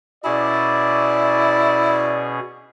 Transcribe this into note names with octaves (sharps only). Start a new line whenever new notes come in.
B2 C#4 E4 G#4 D5